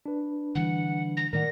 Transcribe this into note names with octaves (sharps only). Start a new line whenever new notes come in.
D4 B4
D3 E3 G3 F#5
A#6
A2 D#3 A#4 D5 F#5 A#6